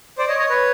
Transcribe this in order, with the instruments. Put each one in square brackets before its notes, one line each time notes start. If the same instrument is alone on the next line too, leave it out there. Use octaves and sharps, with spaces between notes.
[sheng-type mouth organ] C5 D5
C#5 D#5
C#5 D#5
B4 C#5